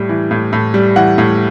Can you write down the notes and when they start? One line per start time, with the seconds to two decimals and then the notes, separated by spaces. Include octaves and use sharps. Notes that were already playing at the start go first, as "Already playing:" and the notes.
Already playing: A2 G3
0.09 E3
0.31 A2
0.53 A2
0.74 G3
0.96 E3 F#5
1.18 A2